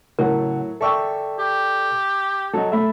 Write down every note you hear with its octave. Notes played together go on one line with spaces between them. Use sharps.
A2 C#3 F#3 A#4 F#5
A4 D5 E5 G5 C#6 E6
G4
F#3 A4 D#5
A3 A4 E5 B5